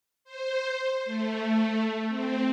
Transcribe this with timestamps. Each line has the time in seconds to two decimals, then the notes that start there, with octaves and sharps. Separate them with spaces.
0.24 C5
1.05 A3
2.08 C4